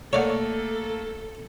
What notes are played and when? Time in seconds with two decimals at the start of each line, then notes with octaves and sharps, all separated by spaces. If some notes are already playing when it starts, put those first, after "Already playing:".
0.13 A3 A#3 A4 C#5 D5 F#5